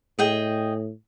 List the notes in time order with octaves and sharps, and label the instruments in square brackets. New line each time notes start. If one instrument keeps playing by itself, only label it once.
[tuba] A2 [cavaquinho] G#4 D#5 G5